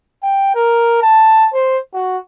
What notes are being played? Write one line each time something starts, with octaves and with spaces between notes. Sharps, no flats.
G5
A#4
A5
C5
F#4